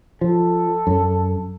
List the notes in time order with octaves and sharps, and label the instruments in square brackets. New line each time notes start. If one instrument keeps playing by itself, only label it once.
[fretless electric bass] F3 [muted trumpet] A4
[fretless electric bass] F#2